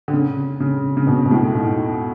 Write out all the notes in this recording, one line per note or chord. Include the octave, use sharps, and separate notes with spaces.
D3
C#3
C#3
C#3
B2
B2
A2
G#2